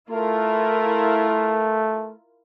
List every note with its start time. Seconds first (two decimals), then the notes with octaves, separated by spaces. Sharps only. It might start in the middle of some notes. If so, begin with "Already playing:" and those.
0.11 A3 E4 F4 A#4